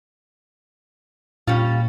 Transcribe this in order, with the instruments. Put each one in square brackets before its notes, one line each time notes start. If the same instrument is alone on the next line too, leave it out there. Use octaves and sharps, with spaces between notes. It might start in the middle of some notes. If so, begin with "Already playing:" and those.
[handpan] A#2 [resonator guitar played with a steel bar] G3 C#4 F4